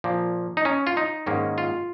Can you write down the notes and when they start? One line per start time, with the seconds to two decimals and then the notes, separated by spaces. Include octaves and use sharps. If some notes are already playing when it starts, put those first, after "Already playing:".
0.04 A#2 F3 A#3
0.57 D#4
0.65 C#4
0.87 F4
0.97 D#4
1.26 G#2 D#3 A#3 C#4
1.58 F4